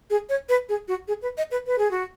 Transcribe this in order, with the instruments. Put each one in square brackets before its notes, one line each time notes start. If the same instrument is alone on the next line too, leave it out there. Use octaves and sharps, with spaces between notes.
[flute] G#4
C#5
B4
G#4
F#4
G#4
B4
D#5
B4
B4
G#4
F#4